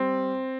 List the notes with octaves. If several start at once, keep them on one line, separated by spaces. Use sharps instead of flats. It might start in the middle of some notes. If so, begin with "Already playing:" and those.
Already playing: G3 C4